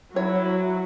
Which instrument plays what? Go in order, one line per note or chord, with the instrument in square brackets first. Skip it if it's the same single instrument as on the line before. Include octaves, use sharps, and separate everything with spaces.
[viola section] F#3 [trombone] E4 [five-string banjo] C#5